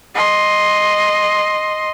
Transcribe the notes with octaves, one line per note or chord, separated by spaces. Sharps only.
D#5 C6